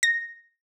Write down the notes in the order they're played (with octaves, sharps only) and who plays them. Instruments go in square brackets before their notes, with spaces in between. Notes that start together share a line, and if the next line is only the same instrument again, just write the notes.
[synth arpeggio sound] A#6